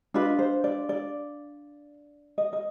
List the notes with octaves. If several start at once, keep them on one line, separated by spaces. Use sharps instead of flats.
D4 F4 B4 D#5
C5
D5
D5
D#5
D#5